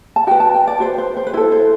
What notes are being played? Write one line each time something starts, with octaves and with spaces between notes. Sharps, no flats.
A5
F#4 B4 G5
A5
G5
D5
F#4 B4 C5
C5
C5
B4
E4 A4 C5
C5